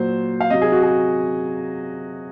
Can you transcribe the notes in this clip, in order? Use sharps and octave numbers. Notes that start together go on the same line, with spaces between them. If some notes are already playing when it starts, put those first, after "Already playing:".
Already playing: A#2 F#3 C5
F5
C3 F#3 D#5
G#4
F#4
G#4